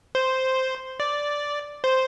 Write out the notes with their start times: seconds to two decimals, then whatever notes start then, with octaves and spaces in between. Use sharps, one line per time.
0.15 C5
1.00 D5
1.84 C5